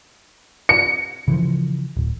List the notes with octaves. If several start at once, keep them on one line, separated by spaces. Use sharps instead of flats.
C#7
C#3 E3 F3
D1